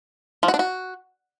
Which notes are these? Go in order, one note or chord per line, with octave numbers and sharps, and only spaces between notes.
F3
F#4
D4
F#4